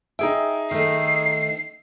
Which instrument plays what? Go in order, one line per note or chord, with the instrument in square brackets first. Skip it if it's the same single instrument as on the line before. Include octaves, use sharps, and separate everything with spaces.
[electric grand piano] D#4 G#4 E5 [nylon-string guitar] G5
[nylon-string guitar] D#3 A3 [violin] C7